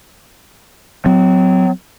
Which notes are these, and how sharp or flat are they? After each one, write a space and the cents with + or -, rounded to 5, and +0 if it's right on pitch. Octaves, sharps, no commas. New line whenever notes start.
F#3 +0 C4 -30